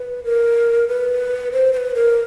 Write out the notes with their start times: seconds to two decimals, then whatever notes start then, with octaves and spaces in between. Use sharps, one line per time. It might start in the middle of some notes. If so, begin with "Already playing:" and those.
Already playing: B4
0.24 A#4
0.88 B4
1.52 C5
1.73 C5
1.77 B4
1.95 A#4